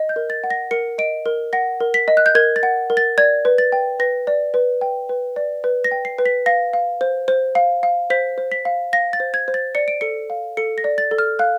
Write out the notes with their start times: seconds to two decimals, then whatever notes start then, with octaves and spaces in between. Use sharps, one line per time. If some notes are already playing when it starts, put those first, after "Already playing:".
Already playing: D#5
0.09 G6
0.16 A#4
0.30 A6
0.44 F#5
0.50 A#6
0.71 A#4 C#7
0.98 D#5 D7
1.26 A#4
1.53 F#5 A#6
1.80 A#4
1.94 B6
2.08 D#5
2.17 F#6
2.26 G6
2.35 A#4 G#6
2.56 A6
2.63 F#5
2.90 A#4
2.97 A6
3.18 D5 G#6
3.45 B4
3.58 A6
3.72 G5
4.00 B4 A#6
4.27 D5
4.54 B4
4.81 G5
5.09 B4
5.36 D5
5.64 B4
5.84 A#6
5.91 G5
6.05 C7
6.18 B4
6.26 B6
6.46 F5 A#6
6.73 F5
7.01 C5
7.28 C5
7.55 F5
7.83 F5
8.10 C5 B6
8.38 C5
8.52 B6
8.65 F5
8.93 F5 A#6
9.13 A6
9.20 C5
9.34 G#6
9.48 C5
9.54 A6
9.75 D5 C#7
9.88 D7
10.01 A4 C#7
10.30 F5
10.57 A4 C#7
10.78 A#6
10.84 D5
10.98 A6
11.11 A4
11.18 F6
11.39 F5 F#6